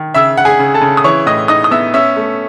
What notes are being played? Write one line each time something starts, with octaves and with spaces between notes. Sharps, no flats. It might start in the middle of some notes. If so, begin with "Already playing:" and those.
Already playing: D#3
C#3 E5 E6
C#3 F#5
G#4 G#5
C#3
A4 A5
C#3
D#6
E3 C#5 C#6
A2 D#5 D#6
D#4 D#5 D#6
D#6
B3 E5 E6
C#4 E5 E6
A3